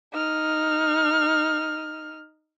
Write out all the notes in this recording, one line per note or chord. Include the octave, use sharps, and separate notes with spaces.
D#4 F6